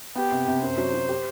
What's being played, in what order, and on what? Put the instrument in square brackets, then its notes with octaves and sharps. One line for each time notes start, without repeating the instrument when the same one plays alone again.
[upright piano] B3 [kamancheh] G4
[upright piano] C3
C3
[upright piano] F#2 [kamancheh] C5
[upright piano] F#3
F#3
G4